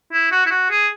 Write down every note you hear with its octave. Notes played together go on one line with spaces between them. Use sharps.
E4
F#4
E4
F#4
G#4